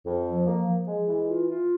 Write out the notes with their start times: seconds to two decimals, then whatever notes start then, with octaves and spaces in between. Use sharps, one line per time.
0.05 F2
0.26 F3
0.46 A#3
0.66 F3
0.86 G#3
1.07 E3
1.26 F4
1.47 F4